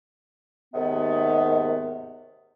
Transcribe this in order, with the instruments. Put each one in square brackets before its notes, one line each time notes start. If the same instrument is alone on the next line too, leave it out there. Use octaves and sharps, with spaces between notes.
[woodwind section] D#2 G#2 C3 D#3 B3